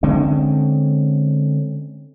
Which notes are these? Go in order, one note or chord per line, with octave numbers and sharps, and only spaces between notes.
D3 G#3 C4 C#4